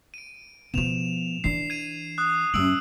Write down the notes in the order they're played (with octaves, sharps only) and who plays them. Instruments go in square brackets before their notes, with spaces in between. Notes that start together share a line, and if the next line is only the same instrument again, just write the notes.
[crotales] D7 D#7
[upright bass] B2 F3 [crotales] E7 F7
[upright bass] E3 D4 [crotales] C7
[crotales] G#6 D#7
D#6 F#6
[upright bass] F#2 C#4 [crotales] E6 D7 F#7